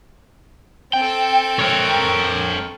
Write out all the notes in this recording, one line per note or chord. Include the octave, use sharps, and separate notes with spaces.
C4 A4 G5
A#4 C#5